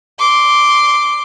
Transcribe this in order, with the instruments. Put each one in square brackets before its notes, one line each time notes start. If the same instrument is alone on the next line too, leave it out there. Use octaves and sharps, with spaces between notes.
[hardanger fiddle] C6 D6